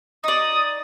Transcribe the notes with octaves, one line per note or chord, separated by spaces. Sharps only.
D#4 D5 D#6